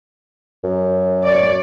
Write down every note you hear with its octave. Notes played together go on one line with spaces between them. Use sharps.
F#2
C#5 D5